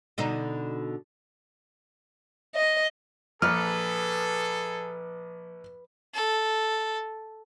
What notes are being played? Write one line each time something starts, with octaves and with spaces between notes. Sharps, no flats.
B2 D3 D#4
D#5
A#1 F3 G#4 A4 B4 F6
A4